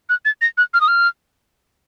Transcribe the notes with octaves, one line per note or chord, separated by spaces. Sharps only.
F#6
A6
A#6
F#6
F6
D#6
F6